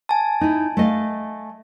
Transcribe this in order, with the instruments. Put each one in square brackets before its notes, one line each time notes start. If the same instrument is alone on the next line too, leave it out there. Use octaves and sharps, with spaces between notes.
[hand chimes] G#5 A5
[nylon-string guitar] D#4 E4
A3 D#5 F5